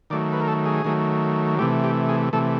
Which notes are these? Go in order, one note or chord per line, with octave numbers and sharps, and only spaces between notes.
D#3 F#3 A3 D5
B4
A#4
A4
G#4
D#3 F#3 A3
C3 E3 A3 G4
G4
G#4
C3 E3 A3 A4